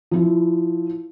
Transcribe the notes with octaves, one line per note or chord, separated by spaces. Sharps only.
F3 E4